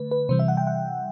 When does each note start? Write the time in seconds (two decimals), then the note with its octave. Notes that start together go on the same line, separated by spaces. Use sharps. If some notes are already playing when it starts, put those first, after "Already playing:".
Already playing: D3 A3 B4
0.11 B4
0.29 C3 E3 G3 C5
0.39 E5
0.48 F#5
0.57 G5
0.67 F#5